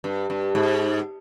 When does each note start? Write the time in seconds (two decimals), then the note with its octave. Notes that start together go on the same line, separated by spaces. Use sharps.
0.04 G2
0.30 G2
0.55 G#2